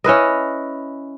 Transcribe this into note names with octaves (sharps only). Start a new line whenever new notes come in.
C#4 E4 B4 D#5